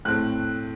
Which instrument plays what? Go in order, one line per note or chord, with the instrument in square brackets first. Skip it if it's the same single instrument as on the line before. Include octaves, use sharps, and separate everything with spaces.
[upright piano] A2 A3 C4 F#6